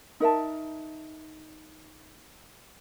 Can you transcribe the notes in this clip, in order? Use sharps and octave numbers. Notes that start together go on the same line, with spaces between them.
D#4 A#4 E5 A5